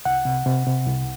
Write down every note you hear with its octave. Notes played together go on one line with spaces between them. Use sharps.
C2 F#5
C3
C3
C3
C2